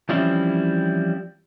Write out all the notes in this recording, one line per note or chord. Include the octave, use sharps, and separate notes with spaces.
E3 F3 G3 C4 C#4 E4